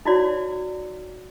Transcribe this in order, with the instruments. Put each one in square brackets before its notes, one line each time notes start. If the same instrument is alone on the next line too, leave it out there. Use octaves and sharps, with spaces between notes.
[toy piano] D#4 E4 F#4 C#5 D5 C6